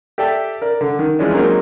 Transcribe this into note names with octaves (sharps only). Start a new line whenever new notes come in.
G4 A4 D5 E5 G5 A5
A#4 D5
D3
D#3
E3 F3 G#3 C#4 D4
F#3 G#3 A#3 C4 D#4